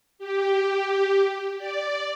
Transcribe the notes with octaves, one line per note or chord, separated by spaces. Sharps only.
G4
D5